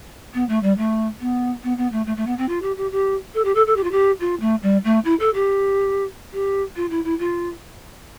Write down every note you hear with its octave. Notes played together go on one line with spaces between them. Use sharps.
B3
A3
G3
A3
B3
B3
B3
A3
A3
A3
B3
C4
F4
G4
G4
G4
A4
G4
A4
A4
G4
F4
G4
F4
A3
G3
A3
E4
A4
G4
G4
F4
E4
E4
F4